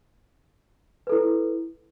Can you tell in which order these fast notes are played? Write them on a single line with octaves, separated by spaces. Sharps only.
B4 A4 E4